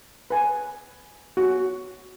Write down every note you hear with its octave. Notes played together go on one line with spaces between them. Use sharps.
B4 G#5
F#4